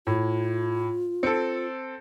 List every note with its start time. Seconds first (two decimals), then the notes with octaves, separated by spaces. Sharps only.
0.07 A2 F4
1.23 C4 A4 C#7